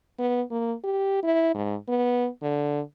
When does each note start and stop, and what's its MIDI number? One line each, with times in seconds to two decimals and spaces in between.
0.19 0.42 59
0.51 0.74 58
0.84 1.19 67
1.23 1.51 64
1.54 1.75 44
1.88 2.29 59
2.42 2.80 50